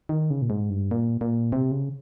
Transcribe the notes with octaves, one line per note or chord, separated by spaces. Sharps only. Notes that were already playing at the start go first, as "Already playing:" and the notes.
D#3
C#3
A#2
G#2
G2
A#2
A#2
C3
C#3